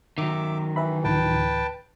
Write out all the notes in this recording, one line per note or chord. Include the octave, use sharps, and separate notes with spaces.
D#3 F#3 E5 D6
E3 B4 E5 B5
D2 A2 E3 B4 G5 A5